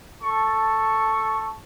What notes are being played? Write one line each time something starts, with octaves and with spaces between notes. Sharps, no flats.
A4 A5 C#6